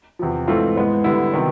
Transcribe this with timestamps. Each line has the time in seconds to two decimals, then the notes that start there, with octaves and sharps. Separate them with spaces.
0.19 E2 C3 F3
0.48 G#2 E3 A3 C4 F4
0.76 G#2 E3 G#3 B3
1.04 D3 G3 B3 E4
1.33 C3 D#3 F#3 B3